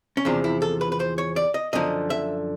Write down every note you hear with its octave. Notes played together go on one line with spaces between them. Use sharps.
C#4
E2 C3 F3 D4
E4
A4
B4
B4
C5
C#5
D5
D#5
F#2 D3 F3 D#5
E5